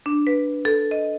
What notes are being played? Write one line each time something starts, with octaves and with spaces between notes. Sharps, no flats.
D4
B4
A4
D#5